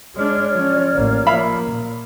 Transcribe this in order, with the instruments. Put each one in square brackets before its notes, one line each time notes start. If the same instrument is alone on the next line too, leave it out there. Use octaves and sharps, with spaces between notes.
[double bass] G#3 D4 [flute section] C#5 D5 F6
[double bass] F3 C#4
A1 A#3
[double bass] F3 A#3 [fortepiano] E5 F5 B5
[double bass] A#2